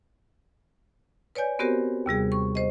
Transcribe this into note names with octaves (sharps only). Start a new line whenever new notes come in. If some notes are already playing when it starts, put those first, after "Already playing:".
B4 C#5 D5 G#5 G6
B3 C4 F#4 G4 A#4 C5
D#2 C3 G3 G#4
C#6
C5 D#5